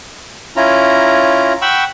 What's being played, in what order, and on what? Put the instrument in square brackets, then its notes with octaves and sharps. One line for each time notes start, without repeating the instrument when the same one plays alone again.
[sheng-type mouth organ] C#4 E4 F4 A#5
F#5 G5 B5 C#6 E6